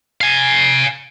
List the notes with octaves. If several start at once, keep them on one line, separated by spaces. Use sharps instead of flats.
F5 G#5